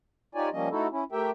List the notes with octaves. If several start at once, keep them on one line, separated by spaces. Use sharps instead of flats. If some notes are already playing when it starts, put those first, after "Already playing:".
D#4 F4 G4 C#5 D5 G#5
F3 G3 A#3 C#4 D#5
A3 D#4 E4 F#4 A4
C#4 E4
A3 G4 A#4 E5 G5